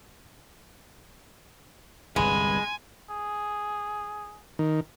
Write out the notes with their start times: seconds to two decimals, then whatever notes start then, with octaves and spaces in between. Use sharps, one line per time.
2.16 G1 C2 G2 G#3 B4 G#5
3.10 G#4
4.59 D#3